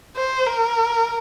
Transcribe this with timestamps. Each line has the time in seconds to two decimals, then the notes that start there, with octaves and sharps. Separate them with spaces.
0.17 C5
0.47 A#4